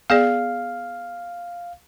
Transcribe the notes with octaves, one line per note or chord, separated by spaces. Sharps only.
B3 G#4 D5 F5